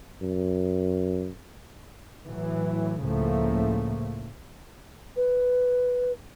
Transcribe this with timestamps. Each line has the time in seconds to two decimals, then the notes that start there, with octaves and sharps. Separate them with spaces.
0.22 F#2
2.27 A2 E3 F#3
3.01 C#2 A2 C#3 F3 A3 A#3
5.16 B4